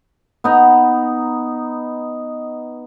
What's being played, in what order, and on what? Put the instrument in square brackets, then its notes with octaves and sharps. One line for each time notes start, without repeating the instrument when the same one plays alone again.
[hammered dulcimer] B3 D#4 A#5